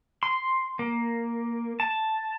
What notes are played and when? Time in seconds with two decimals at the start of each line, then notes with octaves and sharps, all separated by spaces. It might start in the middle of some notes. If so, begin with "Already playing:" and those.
0.23 C6
0.79 A#3
1.80 A5